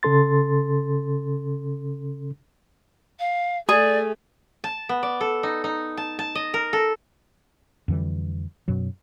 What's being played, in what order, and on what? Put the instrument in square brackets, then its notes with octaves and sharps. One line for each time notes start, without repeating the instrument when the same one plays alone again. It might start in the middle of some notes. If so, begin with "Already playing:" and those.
[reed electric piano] C#3 C#4 A4 C6 A6
[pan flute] F5
[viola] A3 [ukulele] G#4 [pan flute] D5
[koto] A5
B3
D5
A4
D#4
D#4
A5
A5
D#5
A#4
A4
[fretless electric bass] F2 D3 E3 G3
F#2 B2 F#3